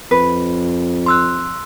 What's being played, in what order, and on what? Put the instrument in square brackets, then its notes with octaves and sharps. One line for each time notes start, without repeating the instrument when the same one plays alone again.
[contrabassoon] F2 [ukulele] B4
[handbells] C6 E6 F#6